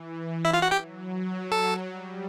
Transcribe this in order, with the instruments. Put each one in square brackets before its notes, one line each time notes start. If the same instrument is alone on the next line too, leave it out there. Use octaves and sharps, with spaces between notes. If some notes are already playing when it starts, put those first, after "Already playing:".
Already playing: [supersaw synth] E3
[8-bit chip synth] E4 E5
F4 F5
F#4 F#5
G4 G5
[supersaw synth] F#3
[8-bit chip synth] A4 A5
[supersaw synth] G3